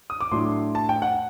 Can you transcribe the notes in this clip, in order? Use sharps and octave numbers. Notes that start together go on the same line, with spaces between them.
D#6
D6
A2 F#3 A3 D4 C6
A5
G5
F#5